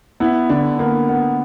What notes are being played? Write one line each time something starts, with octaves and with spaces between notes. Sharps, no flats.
B3 E4
D3 D4
A#3 B3
B3